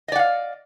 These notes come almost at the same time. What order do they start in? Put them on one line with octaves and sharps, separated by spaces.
D#5 D5 F#5 F5